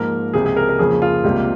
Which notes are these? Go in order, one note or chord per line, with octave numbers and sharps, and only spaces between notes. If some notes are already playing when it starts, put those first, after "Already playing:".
Already playing: G#2 F3 A#3 A#4
C#2 C3 F3 G#4
G#4
A#4
A#4
F2 C#3 F3 A#3 G#4
F4
C#2 C3 G3 A#3